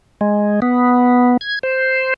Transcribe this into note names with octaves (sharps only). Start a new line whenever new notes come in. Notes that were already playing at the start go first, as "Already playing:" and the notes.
G#3
B3
G#6
C5